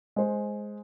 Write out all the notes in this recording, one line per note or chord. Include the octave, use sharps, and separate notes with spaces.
G#3 C5